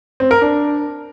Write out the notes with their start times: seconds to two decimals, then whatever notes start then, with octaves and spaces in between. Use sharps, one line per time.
0.20 C4
0.31 A#4
0.41 D4